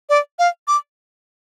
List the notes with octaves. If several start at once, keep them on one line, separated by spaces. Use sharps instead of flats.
D5
F5
D6